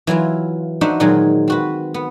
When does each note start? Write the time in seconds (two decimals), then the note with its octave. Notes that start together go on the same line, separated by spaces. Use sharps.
0.07 E3 F#3 E4 F4
0.81 D4 D#4 F#4 C5 E5
1.00 A#2 D#3 F#3 G#3
1.48 C4 F#4 B4
1.94 B3